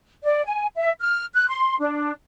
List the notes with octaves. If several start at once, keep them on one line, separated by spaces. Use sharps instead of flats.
D5
G#5
E5
F6
F#6
C6
D4